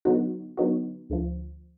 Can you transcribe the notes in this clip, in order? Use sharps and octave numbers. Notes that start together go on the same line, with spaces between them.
D3 F#3 B3 D#4 F#4
D3 F#3 B3 D#4 F#4
D2 D3 F3